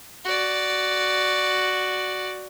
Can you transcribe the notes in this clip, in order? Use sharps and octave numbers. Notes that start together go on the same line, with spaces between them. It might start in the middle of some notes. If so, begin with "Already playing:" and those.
F#4 D5